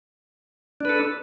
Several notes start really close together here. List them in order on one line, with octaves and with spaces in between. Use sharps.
D4 B4 A4